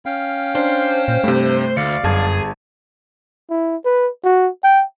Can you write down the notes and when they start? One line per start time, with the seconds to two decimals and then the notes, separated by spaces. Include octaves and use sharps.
0.06 C#4 F5 G5
0.55 D4 C5
1.08 A#2
1.24 G2 C3 A3
1.77 D2 D5 F5 C#7
2.04 G1 F#2 G#4 A5 G#6
3.50 E4
3.85 B4
4.24 F#4
4.64 G5